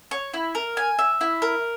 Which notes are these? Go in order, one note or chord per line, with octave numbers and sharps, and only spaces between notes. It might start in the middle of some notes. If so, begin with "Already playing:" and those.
C#5
E4
A#4
G#5
E5
E4
A#4